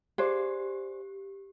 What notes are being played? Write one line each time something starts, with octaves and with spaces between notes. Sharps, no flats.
G4 G#4 C5 D5